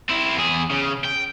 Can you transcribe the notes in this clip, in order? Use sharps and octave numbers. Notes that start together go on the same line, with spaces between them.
C4 E4
E2 G#4
C#3
G5